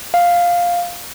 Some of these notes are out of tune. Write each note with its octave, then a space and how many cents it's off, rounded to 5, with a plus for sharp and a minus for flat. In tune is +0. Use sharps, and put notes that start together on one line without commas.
F5 +5